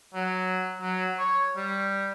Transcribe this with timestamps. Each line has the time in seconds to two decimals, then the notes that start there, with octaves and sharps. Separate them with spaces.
0.14 F#3
0.81 F#3
1.19 C#5
1.56 G3